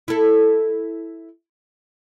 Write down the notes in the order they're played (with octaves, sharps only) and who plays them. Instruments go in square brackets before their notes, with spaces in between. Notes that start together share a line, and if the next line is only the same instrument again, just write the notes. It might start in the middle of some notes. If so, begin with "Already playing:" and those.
[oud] E4 A4